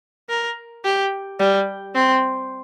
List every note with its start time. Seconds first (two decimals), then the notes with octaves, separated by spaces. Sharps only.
0.29 A#4
0.84 G4
1.40 G3
1.95 C4